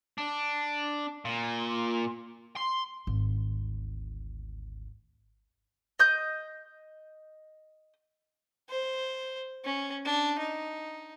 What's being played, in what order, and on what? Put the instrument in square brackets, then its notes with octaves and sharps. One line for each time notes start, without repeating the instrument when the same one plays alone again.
[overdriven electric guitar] D4
A#2
C6
[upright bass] G#1 D2
[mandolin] D#5 G6
[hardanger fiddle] C5
C#4
D4
D#4